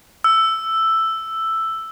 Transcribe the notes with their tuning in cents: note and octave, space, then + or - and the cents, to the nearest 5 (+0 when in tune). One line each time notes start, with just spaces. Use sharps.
E6 +5